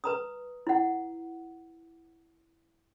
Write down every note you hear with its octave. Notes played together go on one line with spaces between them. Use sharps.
B4 A#5 D#6
E4 F#5